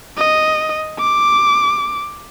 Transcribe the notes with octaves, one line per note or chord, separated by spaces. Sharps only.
D#5
D6